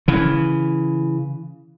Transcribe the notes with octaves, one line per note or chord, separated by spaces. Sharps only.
C#3 E3